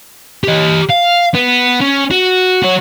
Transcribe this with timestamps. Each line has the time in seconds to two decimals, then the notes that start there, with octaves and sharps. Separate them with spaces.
0.44 G4 D#5
0.89 F5
1.34 B3
1.80 C#4
2.11 F#4
2.63 F#4 C#5